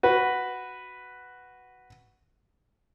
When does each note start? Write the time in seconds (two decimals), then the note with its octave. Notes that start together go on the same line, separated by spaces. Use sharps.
0.03 F#4 B4